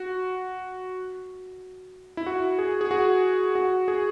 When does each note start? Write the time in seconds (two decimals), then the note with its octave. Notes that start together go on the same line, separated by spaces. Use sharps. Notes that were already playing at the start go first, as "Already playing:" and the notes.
Already playing: F#4
2.17 E4
2.26 F#4
2.59 G#4
2.81 G#4
2.91 F#4
3.55 F#4
3.88 G#4